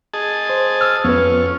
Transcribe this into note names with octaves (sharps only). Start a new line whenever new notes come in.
G#4 D#5 A5
C5
E6 F6
F2 B3 C#4 F4 B4